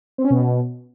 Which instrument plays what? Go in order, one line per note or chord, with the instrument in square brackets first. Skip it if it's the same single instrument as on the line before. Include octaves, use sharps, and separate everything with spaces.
[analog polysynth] C4
C#4
B2